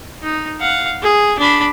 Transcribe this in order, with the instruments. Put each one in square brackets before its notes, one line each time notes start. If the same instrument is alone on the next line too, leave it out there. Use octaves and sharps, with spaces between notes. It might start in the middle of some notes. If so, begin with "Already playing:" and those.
[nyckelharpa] D#4
F5 F#5
G#4
D4 B5